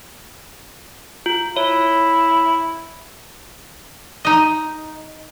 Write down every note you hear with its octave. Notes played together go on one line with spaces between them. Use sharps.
F4
E4 C#5
D#4 D#5